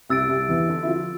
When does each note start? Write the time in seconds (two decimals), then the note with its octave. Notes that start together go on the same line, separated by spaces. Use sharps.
0.09 C2 C3 E6 A6 D7
0.29 C2 C3
0.49 E2 E3
0.69 D3 D4
0.83 E4
0.87 F3 F4